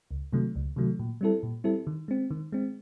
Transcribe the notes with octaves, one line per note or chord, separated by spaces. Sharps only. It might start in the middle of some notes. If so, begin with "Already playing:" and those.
C#2
C3 D#3 F#3 A3
C#2
C3 D#3 F#3 A3
A#2
G3 C4 E4 A4
A#2
G3 C4 E4 A4
D#3
G#3 C4
D#3
G#3 C4